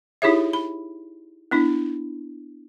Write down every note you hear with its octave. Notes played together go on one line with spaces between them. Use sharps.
D#4 E4 G4 G#4 C#5 E5
B5
B3 D4 E4